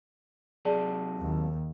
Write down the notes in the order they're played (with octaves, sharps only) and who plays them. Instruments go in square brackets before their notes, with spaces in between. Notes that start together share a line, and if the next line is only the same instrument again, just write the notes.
[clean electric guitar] C3 F#3 A5 [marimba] G#4 D5
[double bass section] D#2